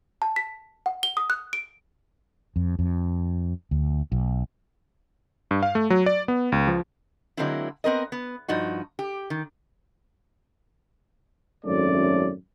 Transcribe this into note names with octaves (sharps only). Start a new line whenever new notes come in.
A5
B6
F#5
G7
D#6
F#6
D7
F2
F2
D2
B1
G2
F5
A3
F#3
D5
B3
C#2
F3
D3 F#3 G#3 A#3 C4 E4
B3 C4 A#4 D#5
B3
G2 F3 D#4 F#4
G4
D#3
G#1 F#2 A2 A3 C#4 D5